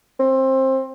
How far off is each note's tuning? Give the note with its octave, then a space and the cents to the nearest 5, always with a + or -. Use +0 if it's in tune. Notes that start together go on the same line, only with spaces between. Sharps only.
C4 +20